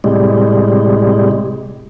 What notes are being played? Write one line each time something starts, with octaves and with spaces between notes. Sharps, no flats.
A2 C3 G3 G#3